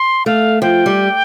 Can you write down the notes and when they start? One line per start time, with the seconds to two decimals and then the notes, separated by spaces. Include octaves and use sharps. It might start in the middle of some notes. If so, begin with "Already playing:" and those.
Already playing: C6
0.26 A3 F5
0.62 F3 G5
0.86 G3